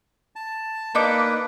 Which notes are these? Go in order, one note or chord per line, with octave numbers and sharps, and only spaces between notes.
A5
A#3 D4 D#4 B4 D6